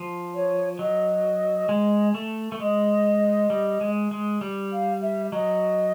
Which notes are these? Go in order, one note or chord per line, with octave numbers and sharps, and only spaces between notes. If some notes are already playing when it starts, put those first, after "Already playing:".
Already playing: F3
C#5
F#3 D#5
G#3
A3
A3
G#3 D#5
G3
G#3
G#3
G3
F5
E5
F#3 D#5